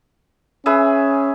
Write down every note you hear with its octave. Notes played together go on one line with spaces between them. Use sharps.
C#4 G#4 B4 E5